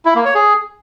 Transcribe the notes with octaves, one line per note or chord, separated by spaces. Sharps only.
E4
A#3
C#5
G#4